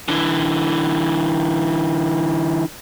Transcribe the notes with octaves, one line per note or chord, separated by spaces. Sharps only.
D3 E3